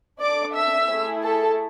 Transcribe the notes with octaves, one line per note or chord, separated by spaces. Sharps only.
D4 A4 D5 D6
E5 E6
A3 E4 G#4
A4 A5